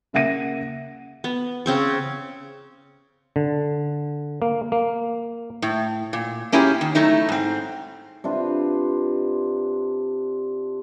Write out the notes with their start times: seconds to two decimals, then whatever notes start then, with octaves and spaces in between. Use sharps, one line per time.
0.13 C#3 A#3 E5 F#5 A#6 D#7
1.24 B3
1.66 C#3 C4 C#6
3.36 D3
4.42 A#3
4.72 A#3
5.62 A2
6.13 A#2
6.52 A#3 C#4 E4 F4 G4 G#4
6.81 D#3
6.95 F#3 A3 D#4 E4
7.29 G#2 C4
8.24 C3 D4 F4 B4